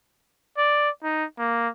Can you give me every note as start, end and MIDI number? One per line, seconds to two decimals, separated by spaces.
0.57 0.90 74
1.03 1.25 63
1.38 1.68 58